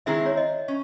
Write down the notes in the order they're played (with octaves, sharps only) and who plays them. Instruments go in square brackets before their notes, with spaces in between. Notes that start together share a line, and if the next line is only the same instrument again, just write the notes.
[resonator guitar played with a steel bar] D#3 G#3 C4 E4 G#4 [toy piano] E5
[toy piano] C#5
D#5
[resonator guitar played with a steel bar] C#4